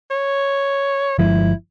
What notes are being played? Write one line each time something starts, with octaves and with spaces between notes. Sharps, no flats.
C#5
G1 F3 G#3 E4